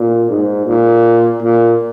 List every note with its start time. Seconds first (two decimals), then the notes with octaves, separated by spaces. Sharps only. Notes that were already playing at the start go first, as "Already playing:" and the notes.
Already playing: A#2
0.30 G#2
0.67 A#2
1.42 A#2